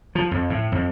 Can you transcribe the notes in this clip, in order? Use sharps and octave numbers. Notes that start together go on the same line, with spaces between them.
F3
F2
A2
F2